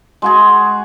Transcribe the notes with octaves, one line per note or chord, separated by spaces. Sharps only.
G#3 F#4 G#4